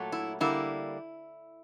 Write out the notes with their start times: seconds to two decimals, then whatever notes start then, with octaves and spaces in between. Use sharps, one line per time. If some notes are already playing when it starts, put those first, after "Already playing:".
Already playing: A#2 F#3 A3
0.12 E4
0.40 D3 G3 A#3 E4